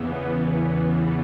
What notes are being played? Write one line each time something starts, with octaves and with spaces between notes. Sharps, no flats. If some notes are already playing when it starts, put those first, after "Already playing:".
Already playing: E2 C#3 E3 B3